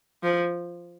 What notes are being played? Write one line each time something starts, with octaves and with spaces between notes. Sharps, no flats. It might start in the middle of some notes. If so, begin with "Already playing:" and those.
F3